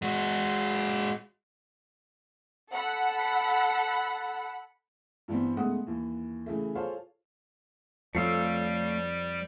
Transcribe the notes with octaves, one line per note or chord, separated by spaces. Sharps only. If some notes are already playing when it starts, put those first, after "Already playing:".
G#3 F#4
A4 F#5 B5
G2 E3 G3 B3 C4
G#2 C#3 A3 B3 F#5 D#6
D#2 E3
C#3 E3 A3
F4 G#4 A4 C5 C#5 F5
F2 G3 A3 F4 A4 C#5 F5 E6